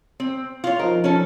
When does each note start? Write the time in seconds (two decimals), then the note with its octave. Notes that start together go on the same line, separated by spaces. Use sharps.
0.20 C4
0.64 F4 C#5
0.79 F3 D#4 A#4
1.04 C#4 A4